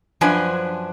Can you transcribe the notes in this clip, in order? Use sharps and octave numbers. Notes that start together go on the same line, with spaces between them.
F#2 F3 D4 B4 C5 G#5